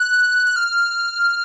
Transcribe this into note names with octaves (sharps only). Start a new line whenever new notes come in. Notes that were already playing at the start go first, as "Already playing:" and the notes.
Already playing: F#6
F#6
F6